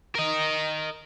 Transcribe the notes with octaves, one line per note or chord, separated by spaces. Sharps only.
A#4 D#5